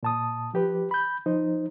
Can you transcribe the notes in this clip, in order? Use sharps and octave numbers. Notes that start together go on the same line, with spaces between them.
A#2 A5 D#6
F3 G4 B4
B5 G6
F3 D#4 C5